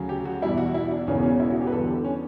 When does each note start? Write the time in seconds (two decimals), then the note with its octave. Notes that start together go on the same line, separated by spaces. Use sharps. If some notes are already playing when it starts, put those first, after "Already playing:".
Already playing: D2 C#3 F#3
0.09 G4
0.25 F#4
0.42 E2 B2 G3 E4
0.58 F#4
0.74 E4
0.91 D4
1.07 E1 E2 C#3 E3 C#4
1.23 C#4
1.40 E4
1.50 F#4
1.61 G4
1.67 B4
1.71 E2 D3 G3 A4
1.88 G4
2.05 C#4